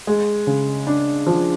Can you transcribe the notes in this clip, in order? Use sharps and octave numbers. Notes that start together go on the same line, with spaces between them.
G#3
C#3
D4
F3